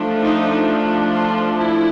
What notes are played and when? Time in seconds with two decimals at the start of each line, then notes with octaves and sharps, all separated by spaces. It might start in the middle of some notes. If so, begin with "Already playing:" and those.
Already playing: F3 A3 D4
0.22 D#4
1.13 F4
1.58 E4